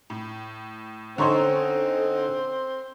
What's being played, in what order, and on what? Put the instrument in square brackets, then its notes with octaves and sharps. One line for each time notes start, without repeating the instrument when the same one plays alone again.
[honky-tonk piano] A2
[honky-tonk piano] D3 C#4 D#4 [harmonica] C4 [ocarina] A4 [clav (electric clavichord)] C5 C#5 A#5